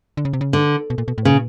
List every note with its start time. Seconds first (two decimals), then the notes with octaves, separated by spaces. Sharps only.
0.17 D3
0.25 C#3
0.33 C3
0.41 C#3
0.53 D3
0.90 B2
0.98 A#2
1.08 B2
1.18 A2
1.25 A#2 C#3